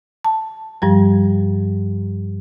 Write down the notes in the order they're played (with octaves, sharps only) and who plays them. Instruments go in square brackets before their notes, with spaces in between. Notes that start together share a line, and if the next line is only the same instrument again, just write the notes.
[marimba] A5
G2 F3 G3